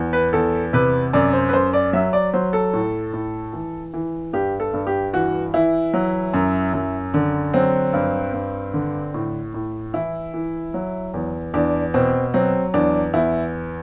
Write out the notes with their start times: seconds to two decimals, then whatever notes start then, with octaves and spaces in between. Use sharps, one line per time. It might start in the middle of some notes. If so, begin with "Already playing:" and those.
Already playing: E2
0.13 B4
0.33 E2 A4
0.73 C3 B4
1.13 F#2 D5
1.33 C5
1.49 B4
1.53 F#2 C5
1.73 D5
1.93 F#3 E5
2.13 D5
2.34 F#3 C5
2.53 A4
2.73 A2
3.13 A2
3.53 E3
3.94 E3
4.33 G2 G4
4.60 A4
4.73 G2
4.87 G4
5.13 E3 F#4
5.54 E3 E4
5.94 F#3
6.34 F#2
6.73 F#2
7.14 D3
7.54 F#3 C4
7.93 G2
8.33 G2
8.73 D3
9.14 A2
9.54 A2
9.94 E3 E4
10.34 E3
10.74 F#3
11.14 E2
11.54 E2 D4
11.94 B2 C4
12.34 F#3 C4
12.74 E2 D4
13.13 E2 E4